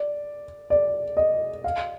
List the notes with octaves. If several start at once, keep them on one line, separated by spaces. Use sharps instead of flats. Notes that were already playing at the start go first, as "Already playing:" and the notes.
Already playing: D5
D5
D#5
F5